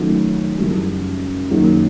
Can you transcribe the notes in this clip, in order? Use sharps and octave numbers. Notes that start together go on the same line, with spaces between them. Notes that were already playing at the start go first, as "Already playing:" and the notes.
Already playing: D#3 F#3 A3 C#4 F4
F#2 C#3 E3 G3
F#2 D#3 F#3 A#3